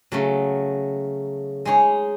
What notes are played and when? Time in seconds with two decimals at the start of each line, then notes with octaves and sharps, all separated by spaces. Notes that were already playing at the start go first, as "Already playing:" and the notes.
0.12 C#3 F#3 A3
1.65 G#3 D#4 G#4 C#5